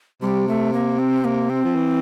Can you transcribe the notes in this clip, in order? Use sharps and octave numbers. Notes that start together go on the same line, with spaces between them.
C3 G3
A3
A#3
C4
A#3
C4
F3
E3